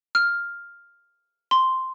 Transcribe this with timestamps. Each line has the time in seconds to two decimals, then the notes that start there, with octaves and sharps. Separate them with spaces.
0.15 F6
1.51 C6